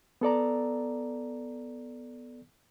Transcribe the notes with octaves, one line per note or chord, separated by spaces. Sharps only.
B3 A4 D5 A#5